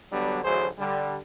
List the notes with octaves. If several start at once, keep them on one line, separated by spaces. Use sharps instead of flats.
D3 F#3 G3 B3 D4
A1 D2 F#3 G#4 C5
D3 G3